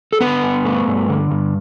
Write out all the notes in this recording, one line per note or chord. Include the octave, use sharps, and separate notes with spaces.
A4
D3 B3 B4
G2
A3
G2
D3
G2